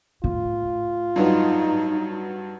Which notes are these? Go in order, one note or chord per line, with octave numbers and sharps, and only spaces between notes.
A2 F4
G2 F#3 B3 D#4